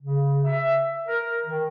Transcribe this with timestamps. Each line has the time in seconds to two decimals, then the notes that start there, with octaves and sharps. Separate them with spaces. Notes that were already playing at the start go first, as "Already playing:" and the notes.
0.03 C#3
0.45 E5
1.07 A#4
1.46 D#3